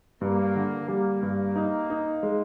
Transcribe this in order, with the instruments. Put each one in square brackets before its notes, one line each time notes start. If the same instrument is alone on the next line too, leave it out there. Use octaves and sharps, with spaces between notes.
[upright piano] G2 [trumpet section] A#3
[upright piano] D3
[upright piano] G3 [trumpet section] A#3
[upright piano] G2
D#4
D#4
G#3